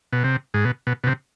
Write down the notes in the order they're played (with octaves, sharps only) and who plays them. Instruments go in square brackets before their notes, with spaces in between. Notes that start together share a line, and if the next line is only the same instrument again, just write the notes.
[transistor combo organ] B2
C3
G#2
B2
B2
B2
C3